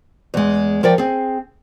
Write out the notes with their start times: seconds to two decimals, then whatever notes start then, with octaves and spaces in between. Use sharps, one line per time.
0.34 E2 G#3
0.83 F3 A#4 C#5 D5 G5
0.98 C4 G#4